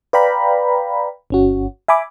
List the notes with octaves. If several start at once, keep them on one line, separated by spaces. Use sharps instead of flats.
B4 D5 F5 G5 A#5 B5
G1 C#4 F#4
E5 G#5 B5 D6